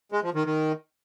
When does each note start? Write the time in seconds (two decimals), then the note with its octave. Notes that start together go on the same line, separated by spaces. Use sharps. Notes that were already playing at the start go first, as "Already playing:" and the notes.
0.12 G#3
0.23 F3
0.34 D#3
0.45 D#3